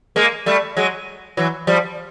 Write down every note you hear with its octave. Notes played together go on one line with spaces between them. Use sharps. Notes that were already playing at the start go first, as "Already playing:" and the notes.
G#3 A#3
G3 A3
F#3 G#3
E3 F#3
F3 G3